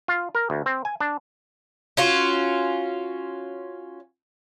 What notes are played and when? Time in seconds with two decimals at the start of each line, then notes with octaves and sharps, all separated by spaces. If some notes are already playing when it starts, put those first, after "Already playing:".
0.08 F4
0.35 A#4
0.50 D2
0.66 C4
0.85 G#5
1.01 D4
1.97 C#4 F4 F#4